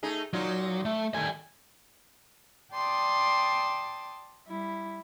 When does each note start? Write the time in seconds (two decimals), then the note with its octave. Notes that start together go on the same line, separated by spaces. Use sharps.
0.03 A3 D#4 G#4
0.33 A#2 F#3 D#4 F4
0.85 A3
1.14 D#3 G3 A3 G#5
2.73 D5 G5 A5 C6 D#6
4.46 G3 E4